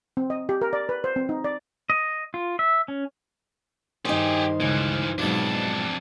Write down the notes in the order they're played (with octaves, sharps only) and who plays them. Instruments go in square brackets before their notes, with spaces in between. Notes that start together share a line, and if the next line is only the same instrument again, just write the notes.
[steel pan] C4
D#5
G4
A#4
D5
B4
C5
C4
D#4
D5
[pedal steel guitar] D#5
F4
E5
C#4
[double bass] G2 D#3 [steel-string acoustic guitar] D#4 C5 [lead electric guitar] G4 G#4
[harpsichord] C#2 [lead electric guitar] E3 F3
[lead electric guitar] F2 D4 [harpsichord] G#2 F3 [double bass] B2 F#3